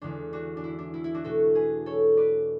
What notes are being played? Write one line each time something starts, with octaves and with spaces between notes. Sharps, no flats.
E2 D3 G#3 D4
D4 F#4
D4
E4
D4
E4
E4
D4 F#4
B2 A3 F#4 A4
G#4 B4
A4 C#5
B4 D5